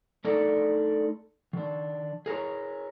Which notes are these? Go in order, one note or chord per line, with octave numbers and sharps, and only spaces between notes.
A3 D4 D#4 A4 A#4 D5
D#3 D4
G#4 A#4 C#5 A#5